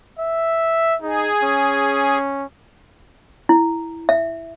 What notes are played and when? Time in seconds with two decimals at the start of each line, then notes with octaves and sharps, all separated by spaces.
0.19 E5
1.02 D#4 G#4
1.43 C#4
3.49 E4
4.09 E5